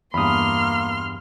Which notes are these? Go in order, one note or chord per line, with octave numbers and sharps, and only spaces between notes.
E2 G2 A#3 B5 C6 D#6 F6